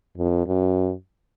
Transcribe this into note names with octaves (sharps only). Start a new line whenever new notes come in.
F2
F#2